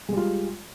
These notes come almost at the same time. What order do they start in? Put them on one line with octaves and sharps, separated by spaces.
G#3 G3 F4